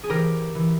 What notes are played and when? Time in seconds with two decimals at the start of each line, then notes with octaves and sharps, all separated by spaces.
0.04 G#4
0.10 E3 G4 A#4
0.55 E3